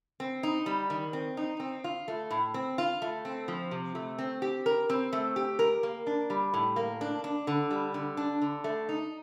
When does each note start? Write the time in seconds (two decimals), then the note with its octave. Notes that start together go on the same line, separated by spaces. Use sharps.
0.20 C4
0.43 D#4
0.66 G3
0.90 D#3
1.13 C4
1.37 D#4
1.60 C4
1.84 F4
2.08 A3
2.31 A2
2.54 C4
2.78 F4
3.02 A3
3.25 C4
3.48 F3
3.71 C3
3.95 A3
4.19 C4
4.42 G4
4.66 A#4
4.90 C4
5.13 A3
5.36 G4
5.59 A#4
5.83 A#3
6.07 D4
6.30 G3
6.54 A2
6.76 A#3
7.01 D4
7.24 D4
7.47 D3
7.71 G3
7.94 D3
8.17 D4
8.42 D3
8.64 A3
8.89 D#4